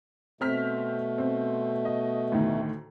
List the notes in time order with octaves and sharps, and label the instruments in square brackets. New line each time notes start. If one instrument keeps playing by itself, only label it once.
[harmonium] B2 A3 [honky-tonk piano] C4 F6 B6
[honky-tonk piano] C4
D#5
D2 A2 D#3